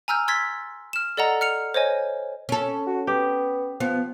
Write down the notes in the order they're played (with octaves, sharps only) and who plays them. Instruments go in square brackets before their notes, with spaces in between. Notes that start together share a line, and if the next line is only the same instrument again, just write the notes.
[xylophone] G#5 A#5 E6 F6 G6
C6 E6 G#6 A6 B6
F6 E7
A4 D5 D#5 F#5 A#5
F6 C#7 F7
C5 C#5 D#5 G#5
[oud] C#4 A4
[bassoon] F#4
[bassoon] B3 [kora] G4
[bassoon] F3 [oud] B3